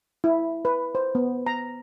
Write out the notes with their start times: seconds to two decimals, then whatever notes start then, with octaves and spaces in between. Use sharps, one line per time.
0.24 E4
0.65 B4
0.95 C5
1.15 B3
1.46 A#5